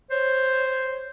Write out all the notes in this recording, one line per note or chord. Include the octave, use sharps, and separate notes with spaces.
C5 C#5